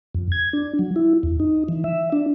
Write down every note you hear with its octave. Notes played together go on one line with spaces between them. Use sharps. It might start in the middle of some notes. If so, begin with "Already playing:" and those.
F2
G#6
D4
F#3
E4
E2
D#4
E3
E5
D4